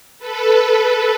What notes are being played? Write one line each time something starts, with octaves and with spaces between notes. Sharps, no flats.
A4 B4